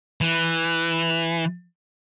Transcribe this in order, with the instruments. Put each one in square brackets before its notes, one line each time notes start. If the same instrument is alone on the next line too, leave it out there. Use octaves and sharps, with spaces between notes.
[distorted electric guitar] E3